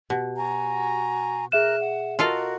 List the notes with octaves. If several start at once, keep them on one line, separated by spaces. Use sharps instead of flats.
B2 G4
F#4 G#5 A#5
G#4 A#4 E5 F6 F#6 E7
F#5
F4 F#4 A4 A#4 D#5 F5